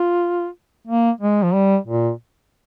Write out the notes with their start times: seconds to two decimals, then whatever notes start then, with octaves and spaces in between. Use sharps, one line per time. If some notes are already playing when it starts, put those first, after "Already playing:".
Already playing: F4
0.88 A#3
1.21 G#3
1.43 F3
1.54 G3
1.87 A#2